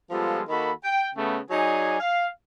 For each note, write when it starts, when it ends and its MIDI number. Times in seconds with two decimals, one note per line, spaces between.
0.10 0.41 53
0.10 0.41 55
0.10 0.41 56
0.10 0.41 59
0.10 0.41 65
0.10 0.41 69
0.49 0.71 51
0.49 0.71 58
0.49 0.71 66
0.49 0.71 69
0.49 0.71 83
0.84 1.09 79
1.15 1.38 49
1.15 1.38 57
1.15 1.38 59
1.50 1.98 54
1.50 1.98 63
1.50 1.98 68
1.50 1.98 74
1.50 1.98 80
2.00 2.27 77